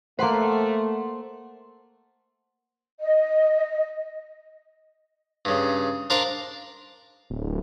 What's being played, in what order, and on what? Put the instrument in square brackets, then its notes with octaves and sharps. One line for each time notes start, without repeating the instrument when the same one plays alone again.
[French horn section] A3 [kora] A#3 B4 [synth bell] C5 F#5 C6
[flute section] D#5
[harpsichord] G2 C#3
D4 A#4 C5 F5
[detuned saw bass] D1